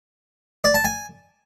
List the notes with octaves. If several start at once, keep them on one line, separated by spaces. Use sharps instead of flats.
D5
A5
G#5